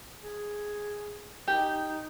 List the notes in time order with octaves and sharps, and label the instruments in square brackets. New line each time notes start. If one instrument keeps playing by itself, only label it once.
[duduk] G#4
[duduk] D#4 [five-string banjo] G4